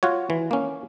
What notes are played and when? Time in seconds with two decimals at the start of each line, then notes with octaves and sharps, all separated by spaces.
0.03 F4 F#4 C#5
0.30 E3
0.51 A#3 C#4